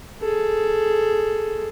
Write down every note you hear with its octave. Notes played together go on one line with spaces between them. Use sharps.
G#4 A4